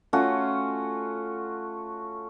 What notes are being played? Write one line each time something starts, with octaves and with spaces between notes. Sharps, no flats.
A3 C#4 F4 F#4